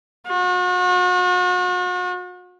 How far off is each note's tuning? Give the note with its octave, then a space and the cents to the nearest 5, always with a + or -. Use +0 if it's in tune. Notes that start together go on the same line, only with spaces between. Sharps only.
F#4 -40